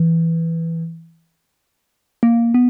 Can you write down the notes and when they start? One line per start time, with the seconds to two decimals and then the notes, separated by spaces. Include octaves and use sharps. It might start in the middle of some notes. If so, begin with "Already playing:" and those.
Already playing: E3
2.23 A#3
2.54 B3